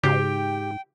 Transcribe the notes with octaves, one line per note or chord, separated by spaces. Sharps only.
G#2 C#3 F#4 G4 G5 C7